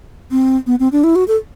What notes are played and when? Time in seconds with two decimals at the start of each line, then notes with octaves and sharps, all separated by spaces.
0.31 C4
0.67 B3
0.80 C4
0.92 D4
1.04 E4
1.15 F#4
1.28 A4